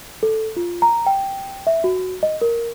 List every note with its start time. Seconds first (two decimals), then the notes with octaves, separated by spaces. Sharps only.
0.23 A4
0.57 F4
0.82 A#5
1.06 G5
1.67 E5
1.84 F#4
2.23 D#5
2.41 A#4